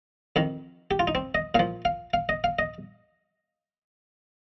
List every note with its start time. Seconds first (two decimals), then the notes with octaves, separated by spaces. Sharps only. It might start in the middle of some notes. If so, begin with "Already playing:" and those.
0.36 F2 D#3
0.91 G4
0.99 F4
1.07 D#4
1.15 C4
1.35 D#5
1.55 A#2 F3 F5
1.85 F5
2.14 F5
2.29 D#5
2.44 F5
2.59 D#5